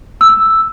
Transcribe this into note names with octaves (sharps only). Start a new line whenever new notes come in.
E6